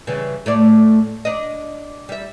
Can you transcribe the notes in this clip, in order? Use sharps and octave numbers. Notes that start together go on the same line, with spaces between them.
C#3 E3 G3
A2 A3 D5
D4 D#5
G3 E5